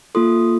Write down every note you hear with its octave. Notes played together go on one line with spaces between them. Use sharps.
A#3 F4 A4 C6 D#6